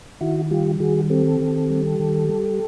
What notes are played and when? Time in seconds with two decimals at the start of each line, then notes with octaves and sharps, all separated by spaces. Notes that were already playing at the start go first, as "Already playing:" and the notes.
0.21 D#3 E4 F#4
0.51 G3 F4 G4
0.80 D#3 F#4 G#4
1.10 C4 G4 A4
1.41 D#3
1.70 G3
1.99 D#3
2.29 G3